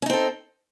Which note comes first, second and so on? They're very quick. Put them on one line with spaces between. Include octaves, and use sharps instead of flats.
C#4 D#4 C4 A4